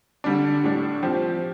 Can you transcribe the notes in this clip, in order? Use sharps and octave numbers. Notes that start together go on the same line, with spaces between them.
D3 G3 D4
A2 G3 D4
F3 C4 G4